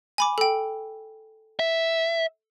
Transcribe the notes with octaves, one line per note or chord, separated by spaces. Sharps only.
G#5 B5 D6
A4 G5
E5